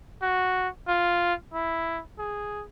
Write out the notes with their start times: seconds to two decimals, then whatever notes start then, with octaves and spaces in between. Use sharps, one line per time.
0.22 F#4
0.88 F4
1.54 E4
2.19 G#4